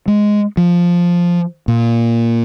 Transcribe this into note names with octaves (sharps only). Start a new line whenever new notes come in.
G#3
F3
A#2